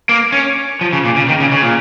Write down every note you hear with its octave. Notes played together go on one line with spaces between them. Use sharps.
A#3
C#4
F3
C#3
A#2
C#3
D#3
C#3
C#3
A#2